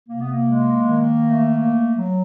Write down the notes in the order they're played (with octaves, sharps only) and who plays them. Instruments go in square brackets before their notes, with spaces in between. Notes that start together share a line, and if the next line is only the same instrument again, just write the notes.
[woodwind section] C3 A#3
B3
A#3
G#3
D#3
A3
A#3
F#3